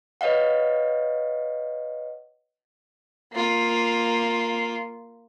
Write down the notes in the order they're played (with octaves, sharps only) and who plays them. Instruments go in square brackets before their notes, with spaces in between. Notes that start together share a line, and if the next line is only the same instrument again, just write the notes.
[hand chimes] B4 C#5 D#5 F5 F#5
[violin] A#3 F4